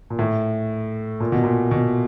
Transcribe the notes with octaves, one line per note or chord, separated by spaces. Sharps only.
A#2
A2
A#2
B2
A#2
B2